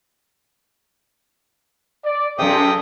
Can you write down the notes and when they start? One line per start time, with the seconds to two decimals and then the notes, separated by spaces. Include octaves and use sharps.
2.04 D5
2.39 F#2 C3 G#4 A4 G5 D#6